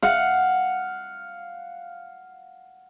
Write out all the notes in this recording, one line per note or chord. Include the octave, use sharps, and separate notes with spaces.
F5 F#5